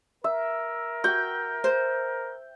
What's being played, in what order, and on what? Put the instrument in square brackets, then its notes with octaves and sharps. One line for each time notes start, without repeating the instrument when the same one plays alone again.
[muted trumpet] A#4 [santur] E5
[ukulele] F#4 [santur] G5
[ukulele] C5